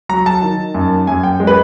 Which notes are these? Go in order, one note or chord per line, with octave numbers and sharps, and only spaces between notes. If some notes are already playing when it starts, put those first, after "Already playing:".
F#3 A#5
A5
D#3
F#2
F#2 G#5
G5
G#3
B4